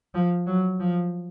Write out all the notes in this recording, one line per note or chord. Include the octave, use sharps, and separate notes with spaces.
F3
F#3
F3